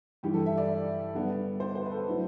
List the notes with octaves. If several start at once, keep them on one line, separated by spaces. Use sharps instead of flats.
G2 E3 G3 G4
A4
E5
D5
D3 G3 B3 D4
C5
C5
B4
A4
D3 F#3 A3 E4